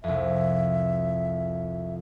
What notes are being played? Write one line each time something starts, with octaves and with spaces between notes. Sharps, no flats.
C2 F2 E5